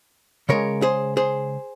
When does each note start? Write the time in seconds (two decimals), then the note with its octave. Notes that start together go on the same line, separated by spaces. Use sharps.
0.49 C#3 G#3 A#4 C#5
0.82 G#4 C5
1.17 G#4 C5